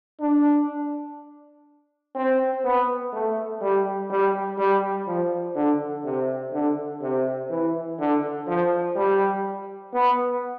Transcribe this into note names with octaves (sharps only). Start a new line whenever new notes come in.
D4
C4
B3
A3
G3
G3
G3
F3
D3
C3
D3
C3
E3
D3
F3
G3
B3